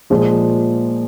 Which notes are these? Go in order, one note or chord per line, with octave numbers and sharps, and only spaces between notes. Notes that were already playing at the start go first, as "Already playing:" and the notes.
A#2 F3 G#3